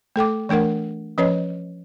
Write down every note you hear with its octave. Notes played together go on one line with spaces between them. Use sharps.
A3 A4 G5 D6
E3 A3 D4 A#4 F#5
F3 C#4 B4 C#5 D#5